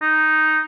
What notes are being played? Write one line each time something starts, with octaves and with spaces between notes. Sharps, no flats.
D#4